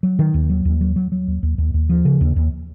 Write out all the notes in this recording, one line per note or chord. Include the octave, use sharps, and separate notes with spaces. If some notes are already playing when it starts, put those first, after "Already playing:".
F#3
D#3
D#2
F#3
D#2
F#3
F#3
F#3
D#2
D#2
D#2
D#2
F3
C#3
D#2
D#2